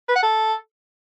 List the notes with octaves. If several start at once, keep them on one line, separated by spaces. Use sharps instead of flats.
B4
F#5
A4